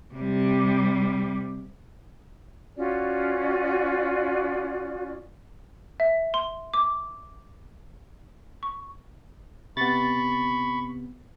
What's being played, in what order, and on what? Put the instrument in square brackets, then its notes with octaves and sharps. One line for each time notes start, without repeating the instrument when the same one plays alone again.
[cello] C3 G3
[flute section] C#4 F4 F#4 D5
[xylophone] E5
C6
D6
C#6
[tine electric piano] C3 B3 [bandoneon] B5 C#6 [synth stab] A6